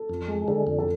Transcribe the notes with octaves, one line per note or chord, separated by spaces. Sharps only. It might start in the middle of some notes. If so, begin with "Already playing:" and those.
Already playing: A4
F2
G#3
D3 A4
F2
A4